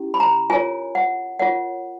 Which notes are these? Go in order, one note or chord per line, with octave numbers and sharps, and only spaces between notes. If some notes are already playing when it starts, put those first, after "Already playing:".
Already playing: C#4 E4 G4
B5
A#5
F4 A#4 C#5 G#5
F#5
F4 A#4 C#5 F#5